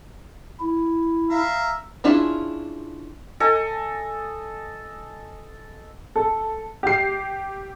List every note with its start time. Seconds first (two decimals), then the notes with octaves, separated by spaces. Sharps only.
0.60 E4
1.30 E5 F5 A#5
2.04 C#4 D4 E4 F4 G#4
3.40 A4 D#5 G#5
6.16 A4
6.83 G4 C7